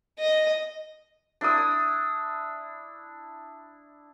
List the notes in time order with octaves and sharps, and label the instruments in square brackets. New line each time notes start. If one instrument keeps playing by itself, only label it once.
[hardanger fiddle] D#5
[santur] D4 E4 E5 D#6